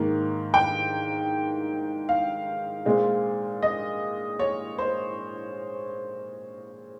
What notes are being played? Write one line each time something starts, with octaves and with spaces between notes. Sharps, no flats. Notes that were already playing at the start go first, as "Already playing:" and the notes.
Already playing: G#2 D#3 A#3
G5
F5
A#2 G#3 C4
D#5
C#5
C5